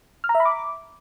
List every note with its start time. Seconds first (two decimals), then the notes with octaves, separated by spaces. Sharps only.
0.24 F6
0.29 A#5
0.35 E5
0.40 B5
0.45 D6